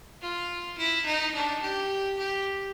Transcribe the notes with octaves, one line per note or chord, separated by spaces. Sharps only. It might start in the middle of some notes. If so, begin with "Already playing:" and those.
F4
E4
D#4
D4
G4
G4